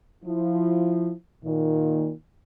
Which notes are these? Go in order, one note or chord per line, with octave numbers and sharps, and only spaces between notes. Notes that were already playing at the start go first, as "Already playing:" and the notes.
F3 E4
A#2 D#3